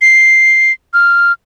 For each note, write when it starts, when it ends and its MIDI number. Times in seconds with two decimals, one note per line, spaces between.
0.02 0.72 96
0.94 1.32 89